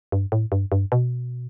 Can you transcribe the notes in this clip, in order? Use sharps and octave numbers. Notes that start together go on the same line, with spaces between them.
G2
A2
G2
G2
B2